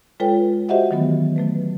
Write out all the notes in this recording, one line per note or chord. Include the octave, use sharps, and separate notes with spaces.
G#3 F4 A4 B4 C#5 G5
F#4 G4 C5 D#5 E5 F#5
D#3 E3 F#3 A3 B3
F#3 A3 B4